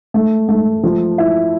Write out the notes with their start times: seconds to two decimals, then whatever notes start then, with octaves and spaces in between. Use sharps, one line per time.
0.14 A3
0.49 A3
0.83 F3
1.18 E4